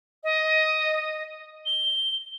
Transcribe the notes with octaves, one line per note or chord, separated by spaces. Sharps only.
D#5
G7